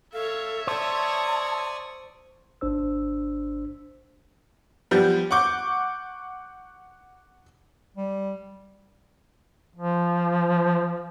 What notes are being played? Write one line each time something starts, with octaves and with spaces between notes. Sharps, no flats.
A4 C#5 E5 F5
C5 D5 A5 C#6 D#6
G#1 D4 C5 E6
F3 G3 B3
F#5 C#6 D6 G6
G3
F3